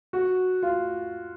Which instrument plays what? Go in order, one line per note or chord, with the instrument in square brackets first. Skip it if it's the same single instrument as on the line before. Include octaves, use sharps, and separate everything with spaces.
[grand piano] F#4
F4